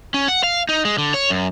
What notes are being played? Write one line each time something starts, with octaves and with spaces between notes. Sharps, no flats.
C#4
F#5
F5
D#4
G#3
D3
C#5
F#2